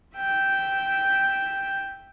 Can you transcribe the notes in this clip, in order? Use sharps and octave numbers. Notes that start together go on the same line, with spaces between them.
E5 G5